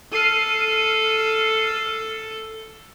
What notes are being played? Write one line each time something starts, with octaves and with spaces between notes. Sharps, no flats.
A4 F6 C7 D#7